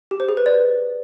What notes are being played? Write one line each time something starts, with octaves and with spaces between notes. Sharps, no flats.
G4
C5
G#4
B4
D5